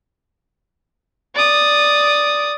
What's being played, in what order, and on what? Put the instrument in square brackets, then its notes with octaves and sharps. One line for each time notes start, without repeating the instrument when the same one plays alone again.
[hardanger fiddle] D5 D#6